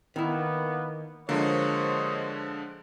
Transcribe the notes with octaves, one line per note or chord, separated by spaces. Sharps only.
D#3 A#3 B3 E4
D3 F3 G#3 A#3 C5 C#5 D#5